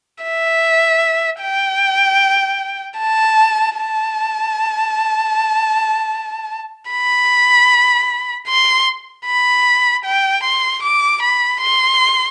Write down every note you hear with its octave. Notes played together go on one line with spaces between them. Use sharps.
E5
G5
A5
A5
B5
C6
B5
G5
C6
D6
B5
C6